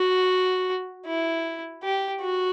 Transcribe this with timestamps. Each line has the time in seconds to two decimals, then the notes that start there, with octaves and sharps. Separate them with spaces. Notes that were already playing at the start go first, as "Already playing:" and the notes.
Already playing: F#4
1.06 E4
1.83 G4
2.22 F#4